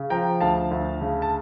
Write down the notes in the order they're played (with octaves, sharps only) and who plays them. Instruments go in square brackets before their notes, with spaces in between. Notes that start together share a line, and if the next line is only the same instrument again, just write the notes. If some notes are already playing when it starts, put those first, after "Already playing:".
Already playing: [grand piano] C#3
F3 G5 A#5
D2 F5 A5
D2
C#3
A5